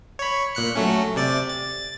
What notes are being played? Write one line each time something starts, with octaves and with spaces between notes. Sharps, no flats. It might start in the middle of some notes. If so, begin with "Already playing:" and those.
C#5 B5
A#2 F#6 C#7
F#3 A3 C#4
C3 D5 A6
A6